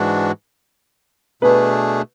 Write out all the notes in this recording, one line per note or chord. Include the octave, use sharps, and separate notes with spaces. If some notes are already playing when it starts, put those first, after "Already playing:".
Already playing: G#2 E3 G#3 D4 F#4
B2 A3 B3 D4 G#4 B4